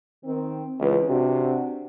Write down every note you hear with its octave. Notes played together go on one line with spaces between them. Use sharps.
D#3 C4
C#2 E3 B4
C3 D4 F#4